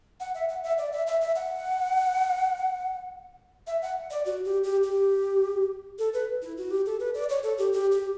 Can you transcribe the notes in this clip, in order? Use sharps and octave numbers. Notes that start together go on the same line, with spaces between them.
F#5
E5
F#5
E5
D5
E5
E5
E5
F#5
E5
F#5
D5
F#4
G4
G4
G4
A4
B4
E4
F#4
G4
A4
B4
D5
C#5
A4
G4
G4
G4